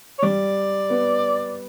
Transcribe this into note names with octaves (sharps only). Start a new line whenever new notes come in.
C#5
G3 D5
B3